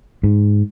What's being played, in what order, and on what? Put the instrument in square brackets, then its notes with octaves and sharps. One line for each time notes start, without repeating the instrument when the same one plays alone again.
[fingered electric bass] G#2